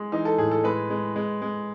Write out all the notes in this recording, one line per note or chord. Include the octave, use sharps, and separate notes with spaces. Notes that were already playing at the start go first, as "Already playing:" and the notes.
Already playing: G#3
E3 D#4
A4
A2 G#4
A4
G#3 B4
G#3
G#3
G#3